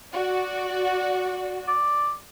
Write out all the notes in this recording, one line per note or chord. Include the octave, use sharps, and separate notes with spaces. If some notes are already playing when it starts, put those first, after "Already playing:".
F#4 D5
D5